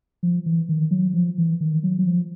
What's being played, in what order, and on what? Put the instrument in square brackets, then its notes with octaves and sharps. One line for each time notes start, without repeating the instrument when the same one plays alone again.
[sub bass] F3
E3
D#3
F#3
F3
E3
D#3
F#3
F#3
F3